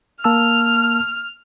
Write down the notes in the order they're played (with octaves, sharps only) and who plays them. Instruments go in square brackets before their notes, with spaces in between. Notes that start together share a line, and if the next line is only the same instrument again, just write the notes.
[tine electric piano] A#3 A5 E6 [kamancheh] F6